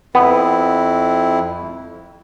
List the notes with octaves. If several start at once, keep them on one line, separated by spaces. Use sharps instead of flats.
F2 B3 E4